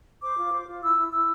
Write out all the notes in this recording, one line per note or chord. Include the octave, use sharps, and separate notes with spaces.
C5 D6
F4
C5
F4
E4 E6
E4
E4 E6